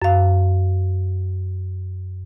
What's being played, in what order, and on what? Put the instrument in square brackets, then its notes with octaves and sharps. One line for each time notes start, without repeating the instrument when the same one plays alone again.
[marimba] F#2 F5